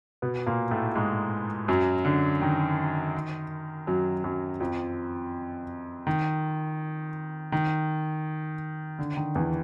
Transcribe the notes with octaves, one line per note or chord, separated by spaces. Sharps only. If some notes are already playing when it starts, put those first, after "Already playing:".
B2 B3
A#2 A#3
A2 A3
G#2 G#3
F#2 F#3
D3
D#3
F#2 F#3
F#2 F#3
F2 F3
D#3
D#3
D3
D#3
E2 E3